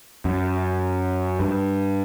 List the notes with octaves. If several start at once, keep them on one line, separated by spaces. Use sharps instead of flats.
F#2
G2